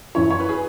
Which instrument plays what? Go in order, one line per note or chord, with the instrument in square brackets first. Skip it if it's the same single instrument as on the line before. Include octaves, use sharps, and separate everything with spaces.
[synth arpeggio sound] F#2 E3 C#4 E4 [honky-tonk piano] C#5
[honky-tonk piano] C#5
B4
G#4